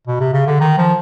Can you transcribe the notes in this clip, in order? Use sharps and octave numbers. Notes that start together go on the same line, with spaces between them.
B2
C3
C#3
D3
D#3
F3